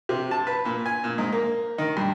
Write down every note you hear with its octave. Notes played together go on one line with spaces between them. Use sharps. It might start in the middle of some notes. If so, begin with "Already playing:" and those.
C3
A5
B4
A#2
G#5
A#2
G#2
A#3
D#3
G2